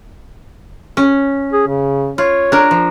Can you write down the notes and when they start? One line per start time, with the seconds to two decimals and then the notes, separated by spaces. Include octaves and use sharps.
0.97 C#4
1.53 G#4
1.68 C#3
2.18 F4 C#5
2.52 D4 A#4
2.71 F3